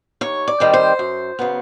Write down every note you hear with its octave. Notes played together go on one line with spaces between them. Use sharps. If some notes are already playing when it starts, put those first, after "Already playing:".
D#2 C#5
D5
D#3 G3 C4
C5
F#2
C#3 F#3 B3